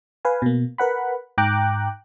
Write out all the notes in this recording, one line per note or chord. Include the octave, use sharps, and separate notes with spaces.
B4 F5 G#5
B2 A#3
A#4 B4 F#5 B5
G#2 G5 A#5 D6 F#6